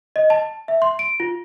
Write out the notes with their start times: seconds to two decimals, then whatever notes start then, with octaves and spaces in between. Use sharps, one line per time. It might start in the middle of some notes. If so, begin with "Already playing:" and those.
0.16 D#5
0.30 A5
0.68 E5
0.82 C6
0.99 D7
1.20 F4